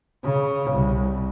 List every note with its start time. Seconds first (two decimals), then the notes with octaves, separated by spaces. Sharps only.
0.23 C#3
0.72 C2